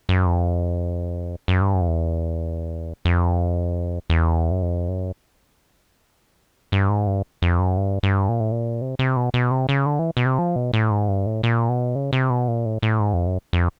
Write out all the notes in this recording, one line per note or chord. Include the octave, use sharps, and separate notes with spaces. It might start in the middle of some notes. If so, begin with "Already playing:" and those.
F#2
F2
F#2
G2
F#2
F2
E2
F2
E2
F#2
F2
F#2
G2
G#2
G2
F2
F#2
G2
G2
A#2
A2
A#2
C3
C3
B2
B2
C3
C#3
D3
E3
B2
C3
F3
B2
A2
G#2
G2
A2
A#2
B2
C#3
C3
B2
A#2
A2
A2
G#2
F2
F#2
F2